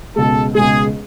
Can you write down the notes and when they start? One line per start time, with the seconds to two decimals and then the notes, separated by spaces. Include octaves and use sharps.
0.16 C#2 B2 G#3 A4
0.55 C#2 B2 G#3 G#4